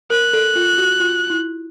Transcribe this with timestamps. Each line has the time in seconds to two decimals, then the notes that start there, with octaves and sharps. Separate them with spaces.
0.10 A#4 F#6
0.33 A4
0.56 F4
0.78 F#4
1.00 F4
1.30 E4